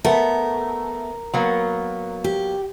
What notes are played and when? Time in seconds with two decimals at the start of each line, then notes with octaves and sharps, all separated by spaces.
0.04 A3 B3 A#4
1.34 F#3 A#3 B3
2.24 G4